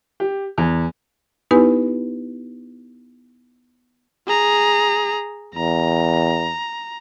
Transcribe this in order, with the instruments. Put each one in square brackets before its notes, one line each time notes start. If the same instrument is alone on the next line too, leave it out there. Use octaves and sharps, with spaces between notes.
[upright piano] G4
E2
[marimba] B3 D#4 E4 G4 B4 G#5
[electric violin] G#4 A#5
[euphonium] E2 [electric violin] A#5